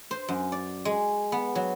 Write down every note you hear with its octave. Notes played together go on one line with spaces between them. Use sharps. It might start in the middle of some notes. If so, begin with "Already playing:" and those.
C5
F#2
D5
G#3
B3
F#3